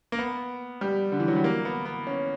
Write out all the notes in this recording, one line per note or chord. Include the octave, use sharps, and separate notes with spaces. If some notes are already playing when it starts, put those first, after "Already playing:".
A#3
B3
G3
D3
E3
F#3
G3
A#3
B3
B3
C#4